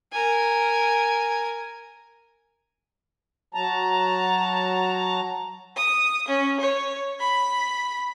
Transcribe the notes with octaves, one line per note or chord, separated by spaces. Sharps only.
A#4 G#5
F#3 A5 A#5
D#6
C#4
C#5
B5